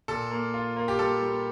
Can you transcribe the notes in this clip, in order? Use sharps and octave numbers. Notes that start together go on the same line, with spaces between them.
A#2 A4
A#3
F4
A#3
G4
G3 A4
G3